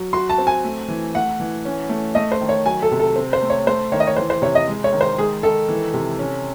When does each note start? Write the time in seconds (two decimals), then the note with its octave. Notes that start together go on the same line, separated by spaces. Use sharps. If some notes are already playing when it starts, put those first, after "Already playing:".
Already playing: F#3
0.13 F#4 C6
0.29 A5
0.38 C4
0.47 G#5
0.64 A3
0.88 E3
1.14 A3 F#5
1.40 E3
1.65 C#4
1.89 A3
2.15 A3 D#5
2.32 C5
2.41 D#3
2.49 C#5
2.66 F#3 G#5
2.82 A4
2.92 C3
3.00 A4
3.16 C4
3.33 C5
3.42 A3
3.50 C#5
3.67 A3 C5
3.92 D#3 C#5
4.00 D#5
4.07 C#5
4.17 E3 C5
4.30 C5
4.42 C3 C#5
4.55 D#5
4.68 G#3
4.84 C#5
4.93 D#3
5.01 C5
5.18 G#3 G#4
5.43 D#3 A4
5.68 E3
5.94 C3
6.19 C#4